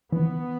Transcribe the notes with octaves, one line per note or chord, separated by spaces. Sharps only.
E3 B3